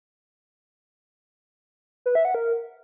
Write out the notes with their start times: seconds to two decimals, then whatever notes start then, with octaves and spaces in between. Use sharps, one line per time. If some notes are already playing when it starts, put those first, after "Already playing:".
2.06 B4
2.15 E5
2.25 F#5
2.35 A#4